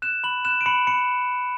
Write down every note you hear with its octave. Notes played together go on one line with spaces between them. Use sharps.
F#6 E7
B5 F#7
F#6 E7
D7
B5 C#7
B5 C#7